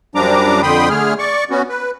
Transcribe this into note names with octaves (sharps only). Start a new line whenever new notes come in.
F#2 F3 G3 D4 A#5 D6
F2 D3 G5 B5 C6 D#6
D3 A3 G#4 F6
D5 C#6
B3 C#4 F#4
B4